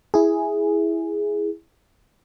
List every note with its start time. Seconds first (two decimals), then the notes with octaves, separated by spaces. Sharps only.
0.14 E4 G#4